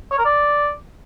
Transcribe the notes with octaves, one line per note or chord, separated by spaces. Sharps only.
C#5
A#4
D5